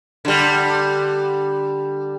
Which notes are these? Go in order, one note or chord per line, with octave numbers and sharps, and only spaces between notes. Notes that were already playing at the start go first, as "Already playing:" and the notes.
D3 G3